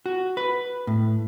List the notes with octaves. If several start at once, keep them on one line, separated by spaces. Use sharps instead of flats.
F#4
B4
A2